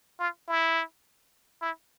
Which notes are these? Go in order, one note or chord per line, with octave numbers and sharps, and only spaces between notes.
F4
E4
E4